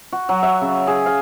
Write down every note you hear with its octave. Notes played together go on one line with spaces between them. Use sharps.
F#4
F#3
E5
C#3
G#4
F5